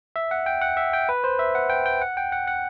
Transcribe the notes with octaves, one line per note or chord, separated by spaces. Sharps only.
E5
F#5
G5
F#5
E5
G5
B4
C5
E5
F#5
G5
G5
F#5
G5
F#5
F#5